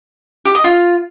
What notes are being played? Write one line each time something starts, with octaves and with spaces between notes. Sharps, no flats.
G4
D#5
F4